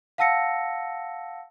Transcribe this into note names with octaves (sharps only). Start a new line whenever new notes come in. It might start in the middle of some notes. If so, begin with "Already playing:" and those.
F5 F#5 A5 E6 A#6 C#7